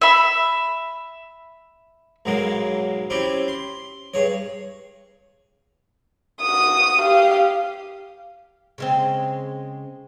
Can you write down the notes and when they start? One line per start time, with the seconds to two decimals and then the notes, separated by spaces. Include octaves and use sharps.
0.02 E5 B5
2.25 B1 G#2 F#3 G#3 A#3
3.10 C4 C#4 E4 G4
3.48 C6
4.14 G2 G#4 C#5
6.42 F#4 D#6
7.00 G4 F5
8.78 C#3 G#3 C4